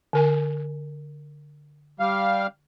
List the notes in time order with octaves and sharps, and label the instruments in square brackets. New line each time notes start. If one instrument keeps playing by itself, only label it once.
[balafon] D3 A#4 G#5
[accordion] G3 F5